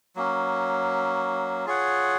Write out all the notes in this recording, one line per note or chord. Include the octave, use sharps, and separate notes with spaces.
F#3 A#3 C#4
F4 G#4 C#5 F#5